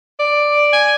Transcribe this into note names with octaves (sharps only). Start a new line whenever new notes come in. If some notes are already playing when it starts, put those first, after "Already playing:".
D5
G#5